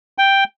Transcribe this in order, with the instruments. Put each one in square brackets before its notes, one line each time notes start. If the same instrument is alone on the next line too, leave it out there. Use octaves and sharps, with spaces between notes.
[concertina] G5